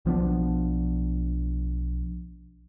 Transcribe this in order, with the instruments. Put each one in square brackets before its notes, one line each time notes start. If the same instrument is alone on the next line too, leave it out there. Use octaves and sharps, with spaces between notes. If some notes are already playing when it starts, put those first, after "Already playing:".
[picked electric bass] B1 F3 B3 D4